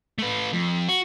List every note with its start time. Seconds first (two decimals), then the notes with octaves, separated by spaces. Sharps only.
0.18 A3 B4
0.53 F2
0.89 F#4